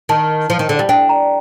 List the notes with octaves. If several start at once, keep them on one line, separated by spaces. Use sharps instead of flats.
D#3 A5
F3
D#3
D3
G3
D4 G5
A#5